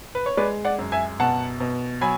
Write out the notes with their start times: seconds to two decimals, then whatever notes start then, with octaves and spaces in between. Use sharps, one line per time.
0.15 B4
0.26 C#5
0.37 G#3 B4 D5
0.65 D5 F#5
0.79 F#2
0.92 E5 G#5
1.20 B2 F#5 A5
1.60 B2
2.01 F#3 G#5 B5